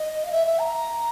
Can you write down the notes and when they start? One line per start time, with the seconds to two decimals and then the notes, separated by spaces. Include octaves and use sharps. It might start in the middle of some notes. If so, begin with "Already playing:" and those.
Already playing: D#5
0.23 F5
0.32 E5
0.46 E5
0.60 A#5